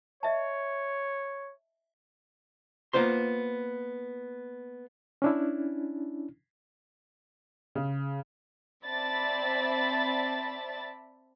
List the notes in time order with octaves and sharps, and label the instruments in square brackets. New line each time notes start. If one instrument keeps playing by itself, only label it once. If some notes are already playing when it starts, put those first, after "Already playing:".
[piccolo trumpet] C#5 [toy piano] D#5 E5 A5
[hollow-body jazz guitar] A#3 B3 F4 C5 C6
[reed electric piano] C#4 D4 E4
[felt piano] C#3
[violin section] C4 D5 E5 A5 B5 A6